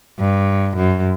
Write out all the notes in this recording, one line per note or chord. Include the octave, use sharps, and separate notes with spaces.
G2
F#2